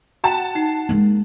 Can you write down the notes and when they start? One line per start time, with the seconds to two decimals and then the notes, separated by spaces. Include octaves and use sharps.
0.24 F#4 F#5 G5 A5 E7
0.55 D#4 C7
0.89 G#3 A#3